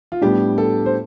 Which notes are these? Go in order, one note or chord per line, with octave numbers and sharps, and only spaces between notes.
F4
A2 G3 B3 D4 G4
A4
C5